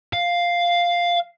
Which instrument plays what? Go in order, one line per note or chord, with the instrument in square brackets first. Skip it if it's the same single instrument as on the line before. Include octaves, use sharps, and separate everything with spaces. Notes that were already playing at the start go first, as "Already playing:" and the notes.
[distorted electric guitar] F5